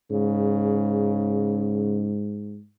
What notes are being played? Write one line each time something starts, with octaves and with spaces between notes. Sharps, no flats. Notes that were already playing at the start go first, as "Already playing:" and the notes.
G#2 C#3